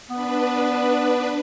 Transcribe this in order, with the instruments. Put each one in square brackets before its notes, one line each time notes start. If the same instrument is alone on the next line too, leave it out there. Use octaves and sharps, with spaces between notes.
[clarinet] B3 [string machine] D4 B4